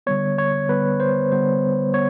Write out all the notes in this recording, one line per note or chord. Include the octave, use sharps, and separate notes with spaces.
D3 G3 B3 C#5
C#5
D3 G3 B3 B4
C5
D3 G3 B3 C5
B3 C#5